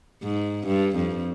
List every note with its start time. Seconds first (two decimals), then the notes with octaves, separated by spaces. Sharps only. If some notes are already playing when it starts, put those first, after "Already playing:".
0.23 G#2
0.67 G2
0.96 F2